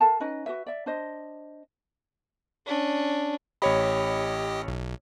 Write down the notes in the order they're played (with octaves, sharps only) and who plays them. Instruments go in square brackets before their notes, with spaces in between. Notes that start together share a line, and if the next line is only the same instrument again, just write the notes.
[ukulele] A4 A#4 F5 A5
C#4 D#4 B4 D#5
F#4 B4 E5
D5 E5
D4 C5 D#5
[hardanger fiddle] C#4 D4
[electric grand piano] A1 C#5 B5 [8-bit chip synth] G4 D#5
[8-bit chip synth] B1